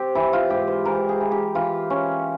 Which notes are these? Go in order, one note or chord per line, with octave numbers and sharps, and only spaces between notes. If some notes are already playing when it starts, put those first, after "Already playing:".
Already playing: C4 G4
E3 E4
F4
G#2 G4
C5
E3 A#4
G#4
E3
G4
E3 F4
C#4